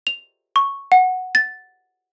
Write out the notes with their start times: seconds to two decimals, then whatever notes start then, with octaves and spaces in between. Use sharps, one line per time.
0.07 F7
0.56 C#6
0.92 F#5
1.35 A6